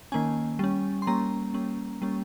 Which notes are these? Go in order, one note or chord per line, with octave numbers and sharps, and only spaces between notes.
D#3 A#3 C#4 G#5
G3 C#4
C6
G3 A#3 C#4 A#5
G3 A#3 C#4
G3 A#3 C#4